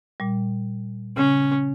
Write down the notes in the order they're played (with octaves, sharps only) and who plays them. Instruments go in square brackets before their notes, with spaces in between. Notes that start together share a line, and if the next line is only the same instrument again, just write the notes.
[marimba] A#2 G3
[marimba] C#3 [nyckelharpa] C#4